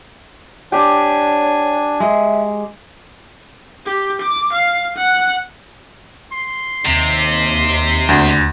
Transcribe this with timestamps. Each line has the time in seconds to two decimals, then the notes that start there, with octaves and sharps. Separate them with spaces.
0.72 D4 G4 C#5 G#5
2.00 G#3 E5
3.86 G4
4.21 D6
4.53 F5
4.97 F#5
6.32 C6
6.85 D#2 C3
8.09 D2